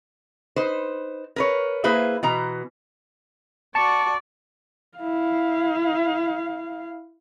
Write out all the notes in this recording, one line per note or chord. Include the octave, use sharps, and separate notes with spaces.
D#4 B4 C5
A#4 B4 C#5
A#3 E4 G#4 B4 C5 E5
B2 E3 A#5
F#4 D5 A5 C#6 C#7
E4 F5